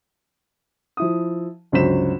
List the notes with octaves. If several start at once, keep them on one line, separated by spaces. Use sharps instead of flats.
F3 E4 D#6
G1 C#2 F#3 C5 B6 E7